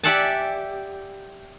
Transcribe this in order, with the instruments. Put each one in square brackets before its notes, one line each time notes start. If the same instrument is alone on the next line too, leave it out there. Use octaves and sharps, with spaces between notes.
[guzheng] G4 D5 E5 F#5 G#5 A5